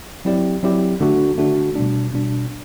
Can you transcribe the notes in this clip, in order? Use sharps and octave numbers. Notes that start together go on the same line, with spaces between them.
F#3 C4 E4 G4 D5
F#3 C4 E4 G4 D5
D3 A3 D4 F#4
D3 A3 D4 F#4
B2 G3 D4
B2 G3 D4